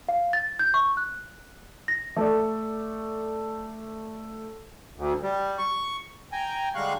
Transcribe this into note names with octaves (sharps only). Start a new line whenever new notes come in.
F5
A6
G6
C#6
F#6
A#6
A3 A4 D5
D2
G3
C#6
G5 G#5 A#5
D3 G3 G#3 F5 C#6 F#6